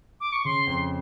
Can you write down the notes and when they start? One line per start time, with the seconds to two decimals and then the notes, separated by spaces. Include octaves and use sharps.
0.21 D6
0.33 C#6
0.45 C#3 C6
0.67 F2